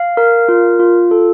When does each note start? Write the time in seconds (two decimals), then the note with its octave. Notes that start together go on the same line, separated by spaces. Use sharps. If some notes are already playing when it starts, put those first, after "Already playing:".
Already playing: F5
0.17 A#4
0.49 F4
0.79 F4
1.11 A4